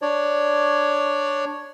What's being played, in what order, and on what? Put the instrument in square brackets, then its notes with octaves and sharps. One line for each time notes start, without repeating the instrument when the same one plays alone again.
[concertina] D4 C#5 D5